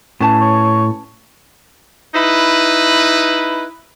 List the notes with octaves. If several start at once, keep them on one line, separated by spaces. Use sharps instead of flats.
A2 C#4 B4 A5
C#5
D#4 E4 B4